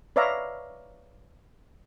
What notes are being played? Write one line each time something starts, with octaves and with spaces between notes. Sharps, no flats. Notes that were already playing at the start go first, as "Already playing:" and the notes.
B4 C#5 D5 E5 F5 A#5